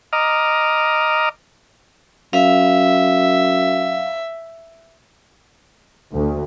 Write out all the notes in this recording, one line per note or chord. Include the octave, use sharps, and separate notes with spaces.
D#5 A#5 D6 D#6 F6
F#2 E5 F5
D2